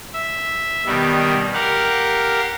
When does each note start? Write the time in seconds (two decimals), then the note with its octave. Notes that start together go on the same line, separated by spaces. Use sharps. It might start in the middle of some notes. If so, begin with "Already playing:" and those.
0.13 E5
0.86 B2 D#3 G3
1.54 G4 A#4 F5 F#5